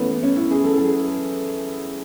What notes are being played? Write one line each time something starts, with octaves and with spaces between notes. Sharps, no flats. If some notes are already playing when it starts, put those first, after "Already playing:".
Already playing: F#2 E3 A3 B3 C#4
C#4
E4
G#4
A4
A4